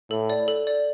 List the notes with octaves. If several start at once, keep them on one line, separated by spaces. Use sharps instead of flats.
A2 A4
D5
A4
D5